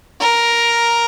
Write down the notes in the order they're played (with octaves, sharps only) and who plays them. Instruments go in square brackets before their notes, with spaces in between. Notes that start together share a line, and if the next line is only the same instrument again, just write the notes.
[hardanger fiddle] A#4